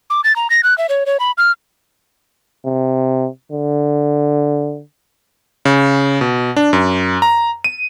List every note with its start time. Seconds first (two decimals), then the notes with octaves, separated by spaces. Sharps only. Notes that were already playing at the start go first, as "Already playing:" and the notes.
0.10 D6
0.24 A6
0.36 A#5
0.50 A#6
0.63 F#6
0.78 E5
0.89 C#5
1.06 C#5
1.20 B5
1.38 F6
2.65 C3
3.52 D3
5.65 C#3
6.21 B2
6.57 D4
6.73 F#2
7.22 A#5
7.64 D#7